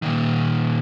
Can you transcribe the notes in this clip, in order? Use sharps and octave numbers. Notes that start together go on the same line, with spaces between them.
A#2 D#3